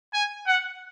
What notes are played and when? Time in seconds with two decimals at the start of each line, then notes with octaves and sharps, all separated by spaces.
0.14 G#5
0.47 F#5